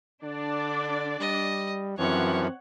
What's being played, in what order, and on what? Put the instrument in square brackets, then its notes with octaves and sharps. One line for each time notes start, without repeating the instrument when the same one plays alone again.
[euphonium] D3 [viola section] D4 D5
[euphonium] G3 [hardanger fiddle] D#5
[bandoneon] F#2 E3 F3 [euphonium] C4 [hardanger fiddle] C#5 [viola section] F#5